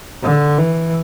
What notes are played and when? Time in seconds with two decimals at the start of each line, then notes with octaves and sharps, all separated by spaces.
0.23 D3
0.58 E3